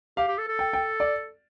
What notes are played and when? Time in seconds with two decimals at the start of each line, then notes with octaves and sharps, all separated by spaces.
0.17 G4 F5
0.28 G4
0.38 A4
0.49 A4
0.59 G5
0.73 G5
1.00 D5